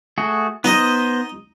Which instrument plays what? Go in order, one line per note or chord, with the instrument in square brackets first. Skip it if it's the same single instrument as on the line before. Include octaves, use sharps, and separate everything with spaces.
[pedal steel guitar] A3 F#4 G#4
[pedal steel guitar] B3 C5 [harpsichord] D#4 D#5